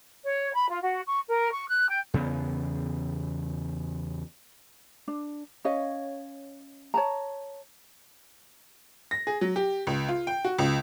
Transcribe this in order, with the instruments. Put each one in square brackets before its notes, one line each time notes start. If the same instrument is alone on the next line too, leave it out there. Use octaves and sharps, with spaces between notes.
[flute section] C#5
B5
F4
F#4
C#6
A#4
C#6
F#6
G5
[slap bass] E2 C#3 B3
[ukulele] D4
C#4 C#5 D#5 F5
C#5 A5 A#5
[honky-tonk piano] A#6
G#4
F#3
G4
C#2
F4
G5
F#4
C#2